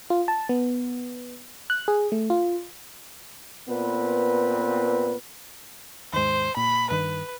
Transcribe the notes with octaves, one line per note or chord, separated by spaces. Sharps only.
F4
A5
B3
F#6
G#4
A3
F4
A#2 B3 C4 B4
D#2 G#2 C5
A#2 B5
G2 D#3 B4